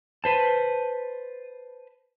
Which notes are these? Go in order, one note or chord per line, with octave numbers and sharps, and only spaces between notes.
B4 C5 A5